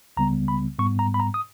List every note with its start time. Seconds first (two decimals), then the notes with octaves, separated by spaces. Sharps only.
0.17 C#2 C#3 G3 B3 A#5
0.48 B5
0.79 G#2 G3 B3 C#6
0.99 A#5
1.14 B5
1.20 A#5
1.34 D#6